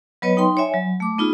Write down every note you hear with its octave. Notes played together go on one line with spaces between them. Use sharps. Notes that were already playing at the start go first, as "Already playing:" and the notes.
F#3 B3 B4 C#5 D#5
D#4 G5 C6
C#5 D5 E5 G#5
F#3
A3 D6
B3 D#4 F4 G#4